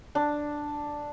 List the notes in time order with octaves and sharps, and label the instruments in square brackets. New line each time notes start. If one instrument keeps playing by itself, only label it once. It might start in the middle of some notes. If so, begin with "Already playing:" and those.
[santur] D4